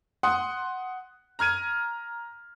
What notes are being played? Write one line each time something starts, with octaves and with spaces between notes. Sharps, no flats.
F#5 C6 D#6
A#5 F6 G#6 D#7